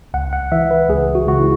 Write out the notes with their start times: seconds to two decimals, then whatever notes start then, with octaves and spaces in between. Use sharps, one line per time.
0.14 C#2 F#5
0.33 F#5
0.52 E3 E5
0.71 B4
0.89 C#2 G#4
1.15 F#4
1.27 C#2 F#4
1.40 E4